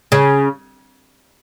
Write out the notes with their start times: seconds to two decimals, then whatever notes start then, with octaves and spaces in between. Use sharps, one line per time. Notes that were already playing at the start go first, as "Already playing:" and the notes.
0.12 C#3